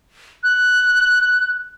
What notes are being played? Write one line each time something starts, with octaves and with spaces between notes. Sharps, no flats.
F#6